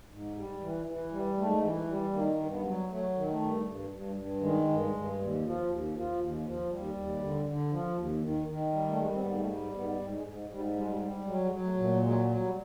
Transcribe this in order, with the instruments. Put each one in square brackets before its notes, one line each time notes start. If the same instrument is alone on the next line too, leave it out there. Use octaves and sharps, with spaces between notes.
[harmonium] G#2
G3
E3
E3
G3
G#2 A3
E3
G3
D#3 A#3
G2
B3
F#3
F#3 A3
D#3
A3
G2
G2
G2
G2
D#3 G#3
G2
G2
D#2
F3
D#2
F3
D#2
F3
D#2 G3
D#2
D3
D3
F3
D#2
D#3
D#3
G3
A3
G3 G#3
C4
B3
G#2 A#3
A3
G3
G#2 B3
G#2
G#3
G#2
G#2 G3
G3 G#3
G3
G3
F#3 G#3
G3
G#3
F#3
A3
A#2
A3
F#3 G#3
F#3
G3